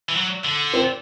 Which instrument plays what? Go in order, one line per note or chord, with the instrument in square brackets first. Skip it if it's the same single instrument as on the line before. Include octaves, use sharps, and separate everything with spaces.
[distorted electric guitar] E3
F#3
D3
[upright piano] C4